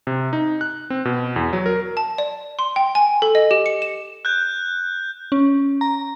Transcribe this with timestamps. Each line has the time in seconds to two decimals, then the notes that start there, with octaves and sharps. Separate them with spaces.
0.07 C3
0.33 D#4
0.61 F#6
0.90 C4
1.05 B2
1.36 E2
1.53 F#3
1.66 A#4
1.97 A5
2.18 D5
2.59 C6
2.76 G5
2.95 G#5
3.22 A4
3.35 D#5
3.51 G4
3.66 C#7
3.82 E7
4.25 F#6 G6
5.32 C#4
5.81 A#5